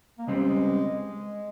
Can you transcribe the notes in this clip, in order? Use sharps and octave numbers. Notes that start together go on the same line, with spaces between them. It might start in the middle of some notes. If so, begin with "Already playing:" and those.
A#3
C#2 C#3 G3 G#3 C4
G#3